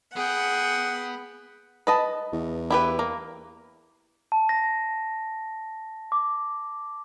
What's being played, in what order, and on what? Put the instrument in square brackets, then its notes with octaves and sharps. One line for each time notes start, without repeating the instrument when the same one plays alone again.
[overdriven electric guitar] B3 [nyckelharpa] G#4 G5 [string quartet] F#5
[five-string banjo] B4 D#5 A5
[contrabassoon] E2
[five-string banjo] E4 G4 B4
A#3
[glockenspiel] A5
A#6
D6